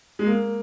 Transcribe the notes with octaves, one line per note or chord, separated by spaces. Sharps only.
G#3
A#3